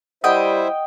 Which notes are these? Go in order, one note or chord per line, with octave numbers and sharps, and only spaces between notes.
G3 E4 C5 D#5 E5 F#5 G5